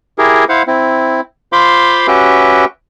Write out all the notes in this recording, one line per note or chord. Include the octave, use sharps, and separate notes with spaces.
E4 G4 G#4 A#4
E4 C5 F5 F#5
C4 E4
F4 C5 F5 B5 C6 D6
C#4 F#4 G4 B4 E5 G5